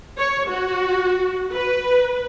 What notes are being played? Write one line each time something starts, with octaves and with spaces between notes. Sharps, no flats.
C#5
F#4
B4